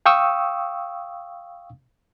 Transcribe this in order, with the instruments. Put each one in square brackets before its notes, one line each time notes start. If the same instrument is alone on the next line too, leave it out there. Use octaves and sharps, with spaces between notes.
[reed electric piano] F5 G5 C#6 D#6 E6